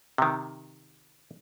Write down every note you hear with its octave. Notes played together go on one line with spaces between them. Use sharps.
C3 D#3